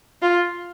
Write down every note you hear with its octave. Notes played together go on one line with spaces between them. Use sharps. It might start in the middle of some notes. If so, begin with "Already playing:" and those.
F4